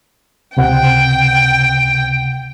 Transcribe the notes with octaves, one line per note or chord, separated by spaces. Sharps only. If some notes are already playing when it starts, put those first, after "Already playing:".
C#2 C3 F#5 G5